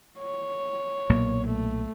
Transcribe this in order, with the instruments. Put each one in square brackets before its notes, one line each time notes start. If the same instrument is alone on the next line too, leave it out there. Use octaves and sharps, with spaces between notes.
[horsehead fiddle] C#5
[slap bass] B1 A#2 A#3
[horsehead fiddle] A3